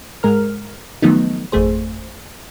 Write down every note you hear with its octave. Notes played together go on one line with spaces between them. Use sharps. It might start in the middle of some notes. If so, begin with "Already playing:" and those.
G#2 G#3 A#4 F6
D#3 F3 F#3 A3 B3 D#4
G#1 F2 A3 G#4 C5